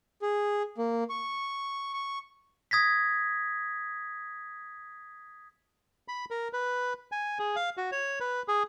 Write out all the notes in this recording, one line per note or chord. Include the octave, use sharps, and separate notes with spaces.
G#4
A#3
C#6
C#6
D#6 G#6 A#6 B6
B5
A#4
B4
G#5
G#4
F5
F#4
C#5
B4
G#4